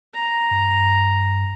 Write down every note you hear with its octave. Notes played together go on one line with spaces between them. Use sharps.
A#5
G2